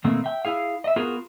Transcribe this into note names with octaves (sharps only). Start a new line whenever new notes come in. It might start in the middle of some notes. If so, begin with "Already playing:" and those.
B2 D#3 A3 A#3 C4
E5 G5
E4 G#4 F5
D#5 E5
B3 F4 F#4 G#4 A#4